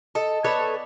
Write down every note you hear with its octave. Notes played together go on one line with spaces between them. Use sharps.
A4 D#5
B3 A4 C#5 D5 F#5 B5